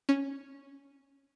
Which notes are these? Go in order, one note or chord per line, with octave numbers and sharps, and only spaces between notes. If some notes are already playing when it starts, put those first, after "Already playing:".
C#4